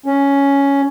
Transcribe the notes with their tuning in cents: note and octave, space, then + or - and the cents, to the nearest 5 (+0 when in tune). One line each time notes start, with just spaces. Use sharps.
C#4 +10